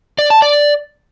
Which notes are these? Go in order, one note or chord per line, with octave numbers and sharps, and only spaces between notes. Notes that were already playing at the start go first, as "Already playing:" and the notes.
D5
A5
D5